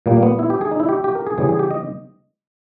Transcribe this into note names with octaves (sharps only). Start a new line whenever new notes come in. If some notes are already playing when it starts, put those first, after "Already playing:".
A#2 G3 A#3
A#3
B3
E4
G4
G#4
D#4
E4
G4
G4
A#4
G#4
C#3 E3 G3 G#4
G#4
G4
D#5